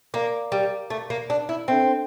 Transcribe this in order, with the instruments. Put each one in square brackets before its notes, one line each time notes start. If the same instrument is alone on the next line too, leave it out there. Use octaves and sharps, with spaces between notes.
[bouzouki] A#3 [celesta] A#4 D5 F5 A#5 D6
[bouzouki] G3
A3
A#3
D4
E4
[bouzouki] C4 [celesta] D4 A4 E5 G5